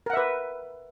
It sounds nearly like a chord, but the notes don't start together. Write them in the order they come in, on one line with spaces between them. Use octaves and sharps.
A#4 F#5 E5 B4